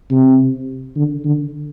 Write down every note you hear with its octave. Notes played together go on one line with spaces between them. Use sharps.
C3
D3
D3